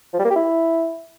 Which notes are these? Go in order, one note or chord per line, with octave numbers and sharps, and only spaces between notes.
F3
G3
A#3
G4
E4